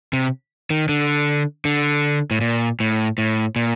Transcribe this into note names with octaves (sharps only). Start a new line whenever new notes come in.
C3
D#3
D3
D3
A2
A#2
A2
A2
A#2